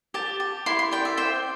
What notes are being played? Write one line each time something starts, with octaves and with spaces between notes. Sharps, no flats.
G4 A5
G4
E4 C6
C6
D5 G5
E5
C5 G5